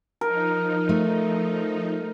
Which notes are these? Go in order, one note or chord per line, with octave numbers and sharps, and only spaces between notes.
F3 D#4 A#4
A3